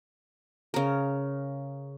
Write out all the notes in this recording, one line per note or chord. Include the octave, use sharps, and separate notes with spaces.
C#3 A#4